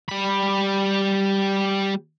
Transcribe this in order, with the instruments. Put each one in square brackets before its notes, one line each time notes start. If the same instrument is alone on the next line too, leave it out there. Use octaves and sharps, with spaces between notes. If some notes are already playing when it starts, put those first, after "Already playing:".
[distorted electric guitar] G3 B5